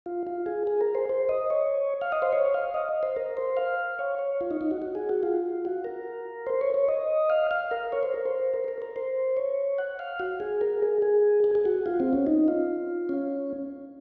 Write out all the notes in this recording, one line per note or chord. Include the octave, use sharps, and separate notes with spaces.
F4
F4
G#4
G#4
A#4
C5
C5
D#5
C#5
F5
D#5
C5
C#5
F5
D#5
C5
A#4
C5
F5
C#5
C#5
F4
D#4
D#4
F#4
F#4
G#4
F#4
F4
F#4
A#4
C5
C#5
C#5
D#5
F5
F5
A#4
C#5
C5
A#4
C5
A#4
A#4
A#4
C5
C#5
F#5
F5
F#4
G#4
A#4
G#4
G#4
G#4
G#4
F#4
F4
C4
C#4
D#4
F4
C#4